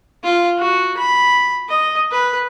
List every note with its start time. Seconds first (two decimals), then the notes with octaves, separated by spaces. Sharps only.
0.24 F4
0.58 F#4
0.97 B5
1.69 D#5
2.11 B4